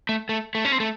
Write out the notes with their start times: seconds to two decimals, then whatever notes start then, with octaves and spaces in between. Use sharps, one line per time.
0.09 A3
0.29 A3
0.55 A3
0.65 C#4
0.72 C4
0.80 A3